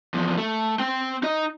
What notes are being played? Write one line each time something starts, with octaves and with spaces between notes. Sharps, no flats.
E2 F3
A3
C4 G5
D#4 D#5